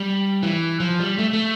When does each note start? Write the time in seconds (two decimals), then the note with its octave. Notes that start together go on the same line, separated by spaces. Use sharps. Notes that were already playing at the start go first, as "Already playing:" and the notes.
Already playing: G3
0.43 E3
0.80 F3
1.00 G3
1.18 A3
1.33 A3